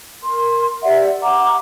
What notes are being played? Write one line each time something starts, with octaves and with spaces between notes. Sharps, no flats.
A#4 C6
G4 D5 E5 F#5
F#5 A#5 D6